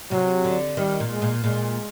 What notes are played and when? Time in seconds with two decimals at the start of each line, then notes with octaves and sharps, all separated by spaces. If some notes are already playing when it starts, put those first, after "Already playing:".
0.11 C3 F#3
0.45 D3
0.77 D#3 G3
1.00 A#2
1.10 G#3
1.22 A#2
1.44 A#2 G#3